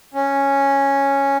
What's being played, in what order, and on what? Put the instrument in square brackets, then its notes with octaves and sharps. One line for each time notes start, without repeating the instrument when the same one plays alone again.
[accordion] C#4